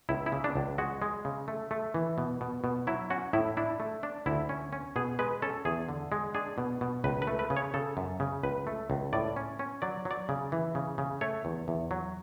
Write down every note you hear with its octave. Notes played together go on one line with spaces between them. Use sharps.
C#2 E4
E4
C#3
D4
C#2
G#3 F#4
G#3
C#3
A3
A3
E3
B2
B2
B2
F#3 E4
C#4 F#4
A2 E4
D4 E4
A3
D4
D2 E4
C#4
C#4
B2 G#4
G#3 B4
C#4 A4
E2 G#4
D3
G#3
D4 G#4
B2
B2
C#2 B4
B4
A3
B4
C#3
C#5
C#3 A4
F#2
C#3
C#2 B4
A3
C#2
A2 D5
C#4
C#4
F#3 D5
F#3
D5
C#3
E3
C#3
C#3
A3 C#5
E2
E2
F#3